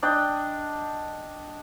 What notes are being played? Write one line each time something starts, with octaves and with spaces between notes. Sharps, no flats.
D4 D#5 G5 B5